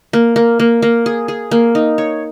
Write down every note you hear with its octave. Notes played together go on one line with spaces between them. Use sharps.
A#3
A#3
A#3
A#3
G#4
G#4
A#3
D#4
C#5